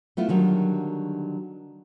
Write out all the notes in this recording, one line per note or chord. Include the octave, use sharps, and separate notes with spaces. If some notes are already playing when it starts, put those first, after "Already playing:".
A3 B3 E4 F4
D3 D#3 F#3 G3